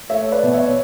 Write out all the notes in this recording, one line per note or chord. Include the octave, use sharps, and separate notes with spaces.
A3 C#5 E5
B4 D5
B2
C#5 E5